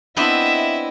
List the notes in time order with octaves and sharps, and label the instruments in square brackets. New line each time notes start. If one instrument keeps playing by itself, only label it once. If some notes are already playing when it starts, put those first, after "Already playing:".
[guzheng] B3 C4 D4 [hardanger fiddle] E4 D#5 [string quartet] E5